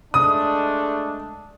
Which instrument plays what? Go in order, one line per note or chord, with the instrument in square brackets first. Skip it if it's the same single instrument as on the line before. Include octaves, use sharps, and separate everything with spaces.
[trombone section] G#3 A3 D4 [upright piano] D#6